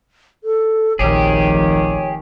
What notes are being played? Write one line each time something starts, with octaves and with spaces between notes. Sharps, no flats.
A4
F1 A#1 D#3 G4 G#4 C#5